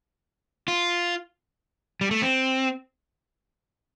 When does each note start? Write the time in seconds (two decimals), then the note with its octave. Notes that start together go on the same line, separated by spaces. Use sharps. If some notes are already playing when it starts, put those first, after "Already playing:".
0.68 F4
2.01 G3
2.11 A3
2.22 C4